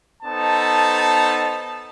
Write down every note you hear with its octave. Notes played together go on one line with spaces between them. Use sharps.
B3 D#4 A4 C5 A5